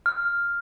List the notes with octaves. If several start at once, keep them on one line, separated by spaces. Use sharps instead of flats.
F6